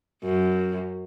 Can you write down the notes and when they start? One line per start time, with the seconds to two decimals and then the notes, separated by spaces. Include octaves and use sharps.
0.24 F#2